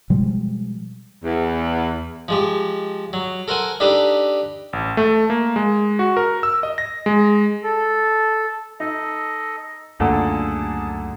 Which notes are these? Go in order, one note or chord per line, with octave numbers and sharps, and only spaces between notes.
B2 F3 G3 G#3
E2
F3 G#3 G4
F#3
A4 A#4 C5 F#5 G#5
D4 D#4 G4 A4 B4
A1
A3
A#3
G#3
F#4
A#4
E6
D#5
A#6
G#3
A4
D#4 A4 D#5
C#2 F#2 A#2 D3 A3 G#4 A4 A5